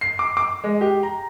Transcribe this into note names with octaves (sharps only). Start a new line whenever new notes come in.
C7
D6
D6
G#3
G4
A#5